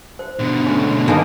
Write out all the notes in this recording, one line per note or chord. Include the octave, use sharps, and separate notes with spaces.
C5
B2 D3
A3 C#4
D#3 A#3 D#4 B4 G#5